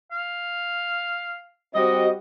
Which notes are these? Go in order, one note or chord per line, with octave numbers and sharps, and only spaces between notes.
F5
G3 C4 F#4 D#5